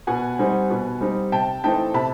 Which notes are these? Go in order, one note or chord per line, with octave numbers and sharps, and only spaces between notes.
B2 F#5 G#5
G3 C4 D#4
B2
G3 C4 D#4
C3 G5 A5
E3 A3 C4 D#4 G5 A5
C3 A5 B5